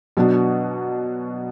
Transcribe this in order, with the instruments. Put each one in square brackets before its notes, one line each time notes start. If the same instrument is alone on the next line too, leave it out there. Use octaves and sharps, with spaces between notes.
[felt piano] B2 F#3 B3 D4 F#4